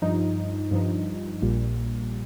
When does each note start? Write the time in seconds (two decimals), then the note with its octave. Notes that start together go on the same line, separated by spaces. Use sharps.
0.02 G2 F3 D#4
0.71 G2 F3 D#4
1.42 A#1 A#2 G3